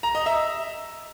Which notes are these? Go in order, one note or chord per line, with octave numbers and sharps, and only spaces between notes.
A#5
D#5
E5